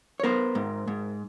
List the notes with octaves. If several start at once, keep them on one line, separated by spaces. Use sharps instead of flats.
C#5
B3 A#4 C5
G#2
G#2